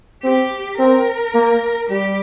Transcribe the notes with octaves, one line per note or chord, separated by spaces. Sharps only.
C4 G4
C4 A#4
A#3
G3 G4